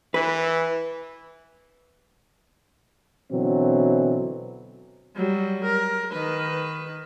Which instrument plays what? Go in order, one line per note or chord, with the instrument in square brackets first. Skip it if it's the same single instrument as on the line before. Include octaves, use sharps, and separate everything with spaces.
[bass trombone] E3 [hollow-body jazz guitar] B4
[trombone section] B2 D3 E3 F#3 C4
[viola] F#3 G3
A#4
D#3 B4